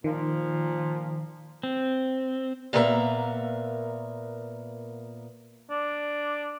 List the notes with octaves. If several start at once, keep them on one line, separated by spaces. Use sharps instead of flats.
A#2 D#3 F3
C4
A#2 A#3 B3 F#4 E5 A#5
D4